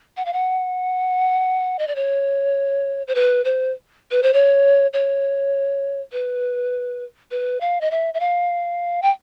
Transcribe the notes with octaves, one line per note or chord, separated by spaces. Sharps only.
F#5
F5
F#5
D#5
D5
C#5
C5
B4
C5
B4
C5
C#5
C#5
B4
B4
F5
D#5
E5
E5
F5
G5